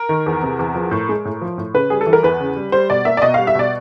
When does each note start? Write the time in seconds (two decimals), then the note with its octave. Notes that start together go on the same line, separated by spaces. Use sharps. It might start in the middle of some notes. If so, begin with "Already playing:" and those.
Already playing: A#4
0.09 D#3
0.26 E2
0.43 C3
0.59 E2
0.75 F3
0.91 A2
1.09 G#3
1.25 A2
1.42 F3
1.58 A2
1.74 C#3 B4
1.90 G3 G#4
2.01 A4
2.07 E3
2.13 A#4
2.23 E2 B4
2.40 C#3
2.56 G3
2.72 G3 C5
2.90 B2 D5
3.05 A#3 E5
3.17 D5
3.22 B2 D#5
3.34 G3 F5
3.47 E5
3.55 B2 D5